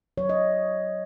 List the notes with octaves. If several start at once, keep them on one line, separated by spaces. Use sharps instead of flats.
F#3 C#5
D#5